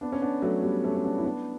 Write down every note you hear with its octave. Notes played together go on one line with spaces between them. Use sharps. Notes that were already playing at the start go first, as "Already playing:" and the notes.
B3 D4
C#4
B3 D4
F#3 A3
G3 B3
A3 C#4
C#4
B3 D4
E4
B3 D4